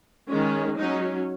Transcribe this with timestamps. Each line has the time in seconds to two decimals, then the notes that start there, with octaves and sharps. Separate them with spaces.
0.28 D#3 G#3 C#4
0.78 F#3 C#4 D#4